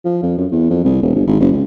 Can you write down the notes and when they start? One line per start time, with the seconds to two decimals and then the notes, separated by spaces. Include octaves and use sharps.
0.05 F3
0.22 F2
0.37 F#2
0.51 E2
0.70 F2
0.84 C2
1.02 E1
1.14 G1
1.27 G#1
1.40 F#1
1.52 C#2